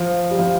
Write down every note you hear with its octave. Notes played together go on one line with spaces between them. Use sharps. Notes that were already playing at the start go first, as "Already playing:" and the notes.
Already playing: F3
G3
F3